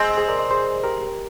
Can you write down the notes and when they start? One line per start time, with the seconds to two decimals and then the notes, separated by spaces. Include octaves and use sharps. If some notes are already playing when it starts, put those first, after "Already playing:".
Already playing: G#3 C4
0.17 G#4 C5
0.28 A#4 D5
0.39 C5 D#5
0.51 G#4 C5
0.84 G4 A#4